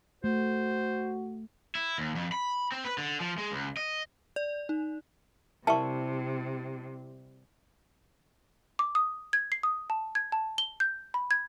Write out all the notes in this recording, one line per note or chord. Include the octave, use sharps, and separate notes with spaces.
A3 F#4 C5
E4
D#2
F2
B5
C4
B4
D3
F3
G#3
C#2
D#5
D5
D#4
C3 G3 E4 A#4 E5 A5 C#6 C#7
D6
D#6
G#6
C7
D#6
A5
G#6
A5
G7
G6
B5
G#6